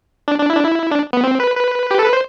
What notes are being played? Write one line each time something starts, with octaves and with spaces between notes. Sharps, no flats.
D4
D4
E4
D4
E4
D4
B3
C4
B4
B4
G4
A4
B4
C5